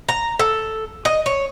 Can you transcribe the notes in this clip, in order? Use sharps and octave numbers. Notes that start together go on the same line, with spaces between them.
A#5
A4
D#5
C#5